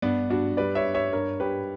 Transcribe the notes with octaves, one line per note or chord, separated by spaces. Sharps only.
G2 B3 D4
G2 D4 F#4
G3 B4 D5
C#5 E5
G2
C#5 E5
G2 A#4 C#5
G2 G4 B4